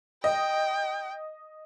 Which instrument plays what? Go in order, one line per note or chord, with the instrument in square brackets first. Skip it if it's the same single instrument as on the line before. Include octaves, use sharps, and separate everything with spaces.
[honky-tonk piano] D#5 [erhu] G5